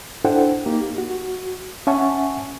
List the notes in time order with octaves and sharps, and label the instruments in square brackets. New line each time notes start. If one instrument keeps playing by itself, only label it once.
[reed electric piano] D4 E4 A4 C5 F#5 G5
A#3 D#4 G4
F#4
C#4 E5 F#5 G#5 A5 C#6